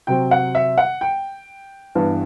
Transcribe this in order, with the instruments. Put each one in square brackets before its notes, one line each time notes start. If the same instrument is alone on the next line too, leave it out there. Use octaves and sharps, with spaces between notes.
[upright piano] C3 F#3 C4 G5
F#5
E5
F#5
G5
G2 E3 B3